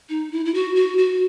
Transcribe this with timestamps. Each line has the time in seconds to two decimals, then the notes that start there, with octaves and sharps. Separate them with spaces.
0.09 D#4
0.32 E4
0.45 E4
0.54 F#4
0.76 F#4
0.98 F#4